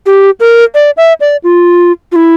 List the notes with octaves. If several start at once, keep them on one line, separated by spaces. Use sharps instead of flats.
G4
A#4
D5
E5
D5
F4
F4
E4